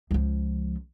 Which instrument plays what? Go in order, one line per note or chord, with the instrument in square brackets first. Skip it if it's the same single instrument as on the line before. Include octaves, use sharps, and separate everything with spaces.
[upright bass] C#2 F3